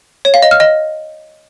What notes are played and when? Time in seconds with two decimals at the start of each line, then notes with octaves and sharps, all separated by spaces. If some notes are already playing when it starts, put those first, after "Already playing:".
0.25 C#5
0.34 F5
0.43 D#5
0.51 F6
0.60 D#5